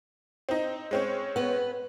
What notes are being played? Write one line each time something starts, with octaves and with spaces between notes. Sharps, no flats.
C4 D#4
G#3 C4 C#4
B3 B4